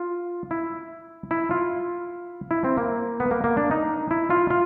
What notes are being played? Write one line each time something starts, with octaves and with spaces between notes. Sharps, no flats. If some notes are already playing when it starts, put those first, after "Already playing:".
Already playing: F4
E4
E4
F4
E4
C4
A#3
B3
A#3
A#3
D4
D#4
E4
F4
F4